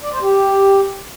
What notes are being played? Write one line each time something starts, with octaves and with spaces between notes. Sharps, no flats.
D5
C5
G4